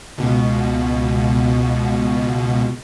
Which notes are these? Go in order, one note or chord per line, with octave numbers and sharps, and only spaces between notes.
C#2 B2